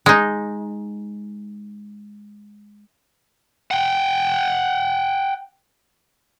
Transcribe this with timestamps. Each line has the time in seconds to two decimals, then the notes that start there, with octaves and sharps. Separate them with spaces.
0.06 G#3 D#4
3.71 F#5 G5